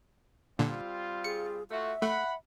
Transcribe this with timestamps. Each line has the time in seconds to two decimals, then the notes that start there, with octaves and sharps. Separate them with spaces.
0.59 A#2 D3 G3 C4 F4
1.24 G#4 C#7
1.71 A3 F4 F#4 E5
2.02 A3 F#5 B5